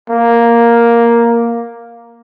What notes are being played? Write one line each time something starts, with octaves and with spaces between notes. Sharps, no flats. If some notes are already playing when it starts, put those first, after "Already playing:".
A#3